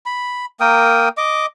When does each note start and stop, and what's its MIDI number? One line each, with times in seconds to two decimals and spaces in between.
0.06 0.45 83
0.60 1.09 58
0.60 1.09 70
0.60 1.09 79
0.60 1.09 87
1.17 1.46 75
1.17 1.46 86